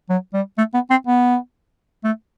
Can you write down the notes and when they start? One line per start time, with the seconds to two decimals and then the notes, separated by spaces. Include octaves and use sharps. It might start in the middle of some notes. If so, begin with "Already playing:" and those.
0.09 F#3
0.34 G3
0.58 A3
0.74 B3
0.90 C4
1.07 B3
2.04 A3